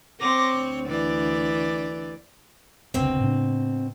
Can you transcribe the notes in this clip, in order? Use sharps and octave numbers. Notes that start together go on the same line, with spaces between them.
C4 C#5 C6 D6 A#6
D2
E3 D5
F1 C#2 B2 D3 C4
A2 C#3 D4